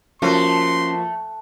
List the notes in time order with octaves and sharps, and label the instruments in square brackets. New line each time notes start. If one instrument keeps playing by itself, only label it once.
[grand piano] F3 A#3 F#4 [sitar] A3 [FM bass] C#4 [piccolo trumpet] C6